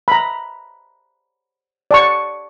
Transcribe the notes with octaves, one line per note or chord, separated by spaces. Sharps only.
A#5 B5
D5 A5 C#6